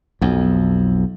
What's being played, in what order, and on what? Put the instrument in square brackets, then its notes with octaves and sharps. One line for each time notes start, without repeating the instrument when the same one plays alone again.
[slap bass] B1 F2